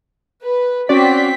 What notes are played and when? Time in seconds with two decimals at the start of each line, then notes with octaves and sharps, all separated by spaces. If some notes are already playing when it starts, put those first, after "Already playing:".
0.43 B4
0.89 C4 C#4 F#4 D5 B6